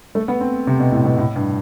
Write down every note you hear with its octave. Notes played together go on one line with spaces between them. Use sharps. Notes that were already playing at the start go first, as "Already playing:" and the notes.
A3
B3
C4
C3
B2
A2
B2
A2
G2